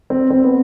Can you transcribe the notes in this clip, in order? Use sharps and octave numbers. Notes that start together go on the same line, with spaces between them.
C4
C4
B3